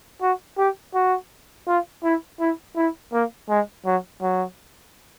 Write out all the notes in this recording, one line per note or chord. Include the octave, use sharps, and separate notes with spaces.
F#4
G4
F#4
F4
E4
E4
E4
A#3
G#3
F#3
F#3